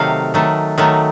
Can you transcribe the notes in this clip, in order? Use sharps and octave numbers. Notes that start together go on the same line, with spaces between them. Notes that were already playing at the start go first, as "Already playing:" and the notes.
Already playing: C3 D#3 F#3 A3 F5
D#3 F#3 A3
D#3 F#3 A3